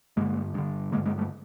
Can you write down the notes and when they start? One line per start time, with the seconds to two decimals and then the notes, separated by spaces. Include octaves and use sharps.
0.17 G2 D3 G#3 A#3
0.54 G2 D3
0.92 D3 G#3 A#3
0.96 G2
1.06 G#3 A#3
1.18 G3 A3